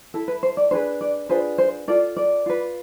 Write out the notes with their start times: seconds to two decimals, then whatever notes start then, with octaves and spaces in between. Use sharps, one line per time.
0.14 E4 A4
0.28 B4
0.43 C5
0.57 D5
0.71 D4 G#4 B4 C5
1.01 D5
1.29 D4 F4 G#4 B4 C5
1.58 C5
1.88 F4 A4 D5
2.17 D5
2.46 F4 B4